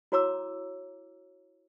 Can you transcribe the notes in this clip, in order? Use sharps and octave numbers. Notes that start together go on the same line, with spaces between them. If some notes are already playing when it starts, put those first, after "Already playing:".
E4 F#4 C#5 A#5 D6 E6